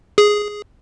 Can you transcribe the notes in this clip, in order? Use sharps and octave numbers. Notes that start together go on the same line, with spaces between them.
G#4